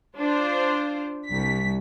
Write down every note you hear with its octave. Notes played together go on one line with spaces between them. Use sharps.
D4 F4 C5
C2 B6